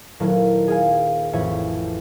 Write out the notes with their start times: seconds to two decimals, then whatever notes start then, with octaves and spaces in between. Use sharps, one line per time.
0.20 D#1 F#3 A#3 E4 A4
0.68 G#4 F5 G#5
1.33 A1 F2 C#5 E5 G#5 C#6